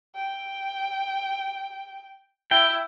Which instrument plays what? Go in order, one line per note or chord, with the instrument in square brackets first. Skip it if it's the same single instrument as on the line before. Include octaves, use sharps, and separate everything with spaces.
[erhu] G5
[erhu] E4 [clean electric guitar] G5